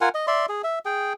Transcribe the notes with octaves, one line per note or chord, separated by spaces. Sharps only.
F4 A#4 F#5 G#5
D#5
D5 E5 C6
G#4
E5
G#4 G5